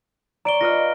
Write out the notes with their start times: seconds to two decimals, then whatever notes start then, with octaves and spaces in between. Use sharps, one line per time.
0.45 D5 A#5 C#6 D7 G7
0.61 F4 B4 D#5 F6 A#6